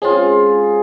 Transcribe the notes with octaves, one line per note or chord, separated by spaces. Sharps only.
G#3 C4 C#4 F4 G#4